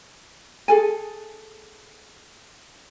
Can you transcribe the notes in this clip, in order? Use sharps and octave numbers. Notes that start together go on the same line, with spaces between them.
G#4 A4 G#5